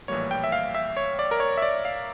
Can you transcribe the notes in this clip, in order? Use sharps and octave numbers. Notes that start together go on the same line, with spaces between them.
A#1 A2 E3 G3 A#3 C#5
G5
E5
F5
E5
C#5
D5
A#4
C#5
E5
D5
F5